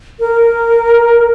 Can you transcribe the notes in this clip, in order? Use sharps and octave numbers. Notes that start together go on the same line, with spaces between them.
A#4